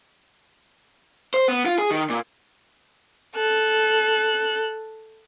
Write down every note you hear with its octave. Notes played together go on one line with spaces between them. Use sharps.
C5
B3
F4
G#4
D#3
A#2
A4 F#6